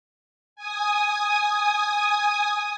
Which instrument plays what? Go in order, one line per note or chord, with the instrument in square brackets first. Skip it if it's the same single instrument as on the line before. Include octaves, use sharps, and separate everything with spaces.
[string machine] G#5 D#6